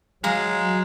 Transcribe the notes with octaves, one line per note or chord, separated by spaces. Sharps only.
F#3 G#3 F5 A#5 D#6